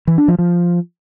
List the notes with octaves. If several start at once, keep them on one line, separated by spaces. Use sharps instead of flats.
E3
D4
F3
F3